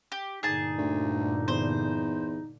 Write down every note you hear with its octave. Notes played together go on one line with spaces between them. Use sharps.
G4
G1 A#2 D3 D#4 G#4 A5
D2
E2 C5